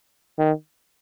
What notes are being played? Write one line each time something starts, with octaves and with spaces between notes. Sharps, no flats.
D#3